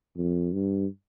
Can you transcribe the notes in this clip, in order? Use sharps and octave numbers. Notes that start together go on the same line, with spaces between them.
F2
G2